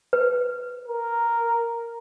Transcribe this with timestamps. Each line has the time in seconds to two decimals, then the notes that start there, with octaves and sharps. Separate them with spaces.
0.13 B4
0.88 A#4